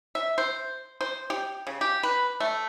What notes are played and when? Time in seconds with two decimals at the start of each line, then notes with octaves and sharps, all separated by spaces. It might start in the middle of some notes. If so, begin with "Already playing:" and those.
0.15 E5
0.38 C5
1.01 C5
1.30 G4
1.67 C#3
1.81 G4
2.03 B4
2.40 A3